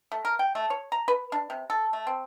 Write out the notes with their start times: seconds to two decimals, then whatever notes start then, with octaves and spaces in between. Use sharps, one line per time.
0.12 A3
0.25 A#4
0.39 G5
0.55 A3
0.70 C#5
0.92 A#5
1.08 B4
1.32 D4
1.50 C3
1.70 A4
1.93 A3
2.07 C4